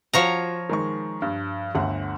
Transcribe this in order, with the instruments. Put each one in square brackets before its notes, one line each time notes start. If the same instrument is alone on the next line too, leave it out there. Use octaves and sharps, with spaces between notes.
[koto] F3 C#5 A#5 [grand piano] F4 F#4
[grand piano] D#3 G#3 C#6
G2
G1 D2 F#5